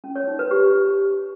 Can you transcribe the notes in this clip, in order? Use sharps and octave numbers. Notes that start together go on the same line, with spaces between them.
C#4
C#5
D#4
B4
G4